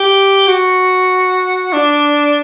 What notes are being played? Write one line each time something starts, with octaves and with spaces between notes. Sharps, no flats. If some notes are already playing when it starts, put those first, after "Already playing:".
Already playing: G4
F#4
D4